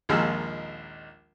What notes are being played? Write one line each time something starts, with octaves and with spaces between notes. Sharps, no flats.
A#1 D#2 F3 G#3 A#4 E6